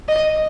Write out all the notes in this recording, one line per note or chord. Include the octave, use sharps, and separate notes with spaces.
D#5